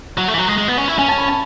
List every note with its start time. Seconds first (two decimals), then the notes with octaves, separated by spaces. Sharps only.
0.18 F#3
0.28 A3
0.34 E3
0.38 F#3
0.48 G#3
0.58 G#3
0.68 B3
0.78 C#4
0.88 E4
0.98 C#4 G#5
1.08 A5
1.18 B5
1.28 A5